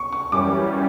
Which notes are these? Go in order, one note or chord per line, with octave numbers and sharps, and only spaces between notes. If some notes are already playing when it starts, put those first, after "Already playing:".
Already playing: C#6
C#6
F#2 E3 G3 C#4 D6